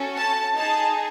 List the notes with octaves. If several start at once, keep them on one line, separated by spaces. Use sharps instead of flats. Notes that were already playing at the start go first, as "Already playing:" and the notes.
Already playing: C#4 F#4 A4
A5
D#4 G#4 A5